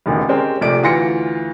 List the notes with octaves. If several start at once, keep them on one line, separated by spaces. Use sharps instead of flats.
E1 A1 D2 D#3
G#3 C4 C#4 G4 A#4
A#1 C3 A3 D5 D7
D2 E3 F4 C6 A#6 C#7